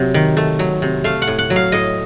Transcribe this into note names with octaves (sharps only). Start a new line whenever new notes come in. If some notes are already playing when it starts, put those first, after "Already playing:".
Already playing: C3 F#3
D#3
A3
F#3
C3
A3 F5
F#5
A2
F#5
F#3
F5
A2 D#5